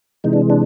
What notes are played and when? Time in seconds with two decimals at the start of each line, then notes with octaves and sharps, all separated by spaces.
0.24 C3 E3 G#3 D#4
0.33 D4
0.50 D4